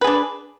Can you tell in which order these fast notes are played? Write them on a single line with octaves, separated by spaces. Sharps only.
B4 G#4 D4